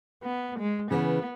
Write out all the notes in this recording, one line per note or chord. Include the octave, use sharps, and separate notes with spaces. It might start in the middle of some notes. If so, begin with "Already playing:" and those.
B3
G#3
C#3 E3 B3